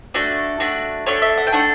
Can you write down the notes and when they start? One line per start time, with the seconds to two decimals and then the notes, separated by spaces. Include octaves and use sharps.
0.14 A3 D4 F#4 A4
0.60 A3 D4 F#4
1.06 A3 D4 A4 C#5
1.22 E5
1.38 F#5
1.47 G5
1.53 A3 D4 A4 F#5